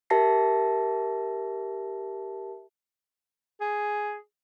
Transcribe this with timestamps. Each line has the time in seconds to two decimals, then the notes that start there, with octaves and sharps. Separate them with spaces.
0.10 G4 A#4 E5 A5 A#6 C7
3.61 G#4